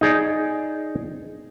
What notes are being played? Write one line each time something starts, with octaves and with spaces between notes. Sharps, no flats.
D#4 G#4 D5